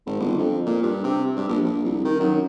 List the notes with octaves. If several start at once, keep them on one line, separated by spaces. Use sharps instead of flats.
G#1
G1
F2
A#2
G2
C3
G2
A#1
A#1
C2
D#3
F#2